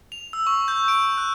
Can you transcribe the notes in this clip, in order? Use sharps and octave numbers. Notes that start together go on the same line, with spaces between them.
F7
E6
C#6
G6
D7
F#6